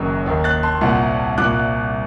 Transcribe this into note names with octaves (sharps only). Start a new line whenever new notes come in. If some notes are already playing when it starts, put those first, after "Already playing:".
Already playing: F#1 F#2 D#3 F#6
D#2 D#3
F#6 A6
A5 C6
C2 A#2 F#5 A5
C2 A#2 D6 F#6